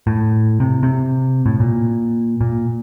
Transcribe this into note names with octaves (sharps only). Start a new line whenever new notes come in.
A2
C3
C3
A2
A#2
A#2